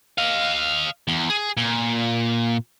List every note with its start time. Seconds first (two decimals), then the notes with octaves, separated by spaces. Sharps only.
0.18 D#5 F5
1.08 E2
1.30 G#4
1.57 A#2